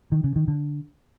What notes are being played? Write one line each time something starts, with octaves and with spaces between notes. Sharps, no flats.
D#3
C#3
D#3
D3